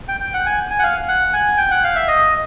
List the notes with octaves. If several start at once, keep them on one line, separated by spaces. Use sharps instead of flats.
G5
G5
F#5
G#5
G#5
F#5
F5
F#5
G#5
G5
F#5
F5
E5
D#5